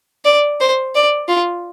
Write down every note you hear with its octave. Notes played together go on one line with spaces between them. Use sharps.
D5
C5
D5
F4